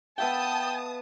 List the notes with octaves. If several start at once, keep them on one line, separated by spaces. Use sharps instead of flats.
B3 E5 F5 G5 A5 D#6